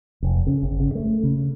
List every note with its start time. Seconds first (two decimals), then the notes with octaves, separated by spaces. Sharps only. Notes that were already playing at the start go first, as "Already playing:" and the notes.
0.23 F1
0.47 C#3
0.63 G1
0.80 C#3
0.95 A3
1.23 C#3